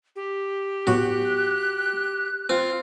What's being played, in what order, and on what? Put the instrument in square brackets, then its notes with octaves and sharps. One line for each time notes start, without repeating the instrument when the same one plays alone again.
[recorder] G4
[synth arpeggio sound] A2 F#3 B3 [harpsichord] F#4 [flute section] F#6
[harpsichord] C4 [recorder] F4